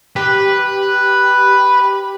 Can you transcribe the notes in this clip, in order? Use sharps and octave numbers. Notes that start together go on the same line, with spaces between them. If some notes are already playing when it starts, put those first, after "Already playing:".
G4 B4